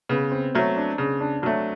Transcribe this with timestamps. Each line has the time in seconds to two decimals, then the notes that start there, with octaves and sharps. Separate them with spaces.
0.09 C#3 B3
0.32 C4
0.55 F#3 A3
0.76 D4
0.98 C#3
1.21 D4
1.42 F#3 A3 D4